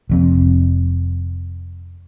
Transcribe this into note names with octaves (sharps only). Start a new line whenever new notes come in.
F1 F2 C4